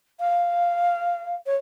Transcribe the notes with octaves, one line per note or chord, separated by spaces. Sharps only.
F5
C#5